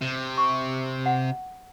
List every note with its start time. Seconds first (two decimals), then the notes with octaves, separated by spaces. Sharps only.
0.01 C3
0.38 C#6
1.06 F#5